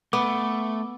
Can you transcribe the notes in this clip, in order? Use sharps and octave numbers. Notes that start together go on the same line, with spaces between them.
A3 B3 D6